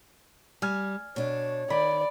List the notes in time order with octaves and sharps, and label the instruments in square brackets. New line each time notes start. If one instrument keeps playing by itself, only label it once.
[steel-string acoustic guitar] G3 [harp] G#5 F6 G#6
[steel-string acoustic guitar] B2 D4 [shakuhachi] C#5
[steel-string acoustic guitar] D#3 [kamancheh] D5 [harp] B5